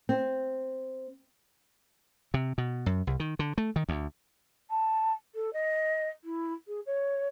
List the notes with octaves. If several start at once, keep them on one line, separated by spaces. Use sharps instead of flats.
C4
C3
B2
F#2
C2
D#3
D3
A3
D#3
D2
A5
A4
D#5
E4
G#4
C#5